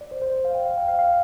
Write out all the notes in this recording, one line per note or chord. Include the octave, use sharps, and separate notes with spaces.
D5
C5
C5
F5
G5
F5
G5
F5
F5